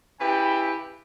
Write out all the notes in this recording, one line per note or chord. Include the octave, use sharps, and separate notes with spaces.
C#3 E4 G4 B4 G5